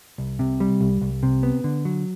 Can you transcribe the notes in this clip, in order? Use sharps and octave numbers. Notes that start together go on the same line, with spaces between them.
C2
C3
G3
C2
C2
C3
B3
D3
F#3